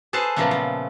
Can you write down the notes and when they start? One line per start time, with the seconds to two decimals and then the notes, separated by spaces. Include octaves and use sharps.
0.13 G#4 A4 B4 C5 A5
0.36 A#2 C#3 F3 F#3 A3 B3
0.51 F3